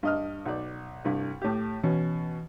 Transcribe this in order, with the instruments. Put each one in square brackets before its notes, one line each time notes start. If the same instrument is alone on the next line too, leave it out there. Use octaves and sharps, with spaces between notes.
[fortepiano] G2 D#5 F6
B1 D5
C2 G2
A2 G4
[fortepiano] B2 C#4 [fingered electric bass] E3